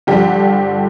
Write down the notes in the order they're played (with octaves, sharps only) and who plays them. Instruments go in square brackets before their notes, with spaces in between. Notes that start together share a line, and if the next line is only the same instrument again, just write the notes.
[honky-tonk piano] G2 D3 F3 G4